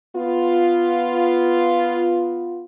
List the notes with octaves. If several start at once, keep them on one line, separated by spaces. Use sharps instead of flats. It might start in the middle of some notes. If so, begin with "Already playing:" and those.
B3 F4